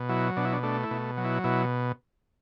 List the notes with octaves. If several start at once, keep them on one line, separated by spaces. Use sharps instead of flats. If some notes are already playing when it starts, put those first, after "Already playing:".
Already playing: B2
F#3 E4
B2 D4
E4
D4
A3 D4
E4
B2
F#3
E4
B2 E4